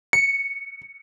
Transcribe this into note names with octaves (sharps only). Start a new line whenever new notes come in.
C#7